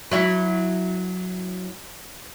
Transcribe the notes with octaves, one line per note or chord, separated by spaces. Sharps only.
F#3 E4 F#4